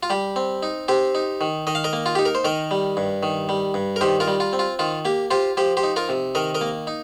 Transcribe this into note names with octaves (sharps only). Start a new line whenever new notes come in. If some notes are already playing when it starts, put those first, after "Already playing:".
F4
G3 G4
C4
D#4
C4 G4 C5
D#4
D#3
D#3 D#5
F5
A#4 D#5
A#3
F4
D#4 G4
A#4
C5
D#3 A#4 D#5
G3
G2
D#3
G3
G2
A#4
D#3 G4 C5
F4 A#4
G3
F4
C4
F4
D#3 F4
A#3 G4
F4 G4 C5
F3 G4 C5
G4 C5
D#4
F4 A#4
C3
D#3 A#4 D#5
A#4 D#5
A#3
D#4